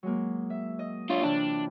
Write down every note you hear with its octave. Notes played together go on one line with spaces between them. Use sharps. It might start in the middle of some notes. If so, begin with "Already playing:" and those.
F#3 G#3 A#3
E5
D#5
D4 F4 G4 C#5 E5
C3 E3 D4 F4